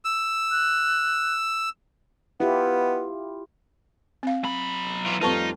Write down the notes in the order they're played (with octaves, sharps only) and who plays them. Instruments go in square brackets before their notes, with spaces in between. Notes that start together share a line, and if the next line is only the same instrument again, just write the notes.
[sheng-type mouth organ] E6
[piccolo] F#6
[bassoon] B3 [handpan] E4 F4 G4
[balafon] C4 F5
[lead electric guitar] F#3 B5
[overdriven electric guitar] E3 F4
[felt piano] F2 G3 A3 [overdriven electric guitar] D#4 [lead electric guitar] F4 [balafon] B4 A5 C#6